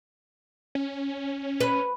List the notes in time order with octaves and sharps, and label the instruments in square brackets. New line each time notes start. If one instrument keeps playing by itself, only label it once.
[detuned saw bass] C#4
[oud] B4